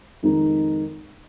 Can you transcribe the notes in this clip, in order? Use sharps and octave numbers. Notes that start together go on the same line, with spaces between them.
F2 D#3 G#3 D#4